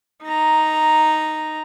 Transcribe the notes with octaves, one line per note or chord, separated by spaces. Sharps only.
D#4 A#5